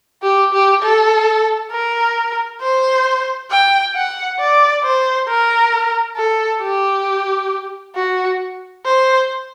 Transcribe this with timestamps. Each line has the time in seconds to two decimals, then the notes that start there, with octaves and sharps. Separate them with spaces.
0.23 G4
0.53 G4
0.82 A4
1.71 A#4
2.61 C5
3.51 G5
3.94 F#5
4.39 D5
4.84 C5
5.28 A#4
6.17 A4
6.62 G4
7.96 F#4
8.85 C5